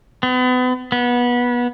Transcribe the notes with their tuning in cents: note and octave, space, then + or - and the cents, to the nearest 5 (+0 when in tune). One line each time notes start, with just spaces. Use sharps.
B3 +35
B3 -20